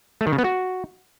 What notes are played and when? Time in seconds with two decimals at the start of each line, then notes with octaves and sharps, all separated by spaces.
0.21 A3
0.27 D#3
0.33 C#3
0.38 B3
0.44 F#4